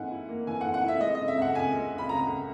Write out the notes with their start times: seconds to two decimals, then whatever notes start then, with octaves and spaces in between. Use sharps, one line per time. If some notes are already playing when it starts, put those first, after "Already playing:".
Already playing: G#2 E3 A#3 F#5 G#5
0.11 E4
0.29 A#3
0.47 E3 G#5
0.61 F#5
0.66 G#2
0.74 F#5
0.83 E4 E5
1.01 G#3 D#5
1.15 C#3 D#5
1.28 E5
1.37 C#2 F#5
1.55 C#2 G#5
1.73 G#3
1.91 C#3
1.98 B5
2.09 C#2 A#5
2.27 C#2